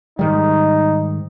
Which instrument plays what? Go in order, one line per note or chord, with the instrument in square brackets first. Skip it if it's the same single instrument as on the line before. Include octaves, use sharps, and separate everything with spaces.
[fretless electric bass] G#2 D#3 G3 [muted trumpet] D#4